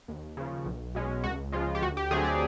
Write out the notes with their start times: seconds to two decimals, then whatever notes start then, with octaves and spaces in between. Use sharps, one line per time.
0.08 D#2
0.37 C#3 F3
0.66 B1
0.95 B2 G#3 C#4
1.24 C#2 F#4
1.52 C#3 F3 G#3 F4
1.75 G4
1.82 D2 F#4
1.97 G4
2.11 D3 F#3 A3 C4 G#4
2.25 D5